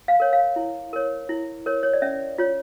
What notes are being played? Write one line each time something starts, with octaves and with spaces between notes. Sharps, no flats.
F5
A#4 C#5
F5
E4
A#4 C#5
E4
A#4 C#5
C#5
D5
C#4 E5
F4 C#5